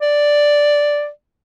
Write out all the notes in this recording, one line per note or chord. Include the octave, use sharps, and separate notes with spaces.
D5